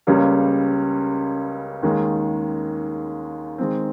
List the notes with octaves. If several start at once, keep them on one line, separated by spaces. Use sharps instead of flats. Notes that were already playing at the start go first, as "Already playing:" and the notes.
C#2 C#3 G3 A#3 C#4
D#2 D#3 G#3 C#4
D#3 G#3 C4